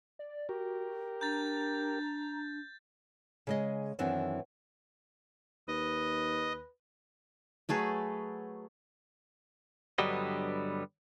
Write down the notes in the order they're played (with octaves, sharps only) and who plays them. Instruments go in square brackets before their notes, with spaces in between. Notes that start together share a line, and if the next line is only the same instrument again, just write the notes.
[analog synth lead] D5
[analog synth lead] F#4 [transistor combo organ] G4 A#4
[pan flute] D4 [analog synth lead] A#5 [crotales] G6 A6
[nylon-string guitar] C#3 G#3 D#5
F#2 D#3 E3 B3 C4 D4
[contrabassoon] D#2 [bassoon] B4 [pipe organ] D#5
[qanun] F#3 A3 G#4 B4
[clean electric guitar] G2 D3 F#3 G3 B3 D#5